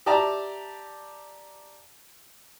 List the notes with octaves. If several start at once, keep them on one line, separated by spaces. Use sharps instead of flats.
G4 D5 E5 A5 A#5